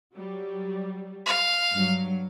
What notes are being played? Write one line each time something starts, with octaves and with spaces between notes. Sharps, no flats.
F#3 G3
F5
G2 F#3